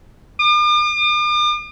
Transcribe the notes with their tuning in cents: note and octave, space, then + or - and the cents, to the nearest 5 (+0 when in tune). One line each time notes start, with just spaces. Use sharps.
D6 +45